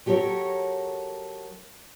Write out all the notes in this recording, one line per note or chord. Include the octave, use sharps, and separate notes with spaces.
F#3 G4 A4 A#4 C#5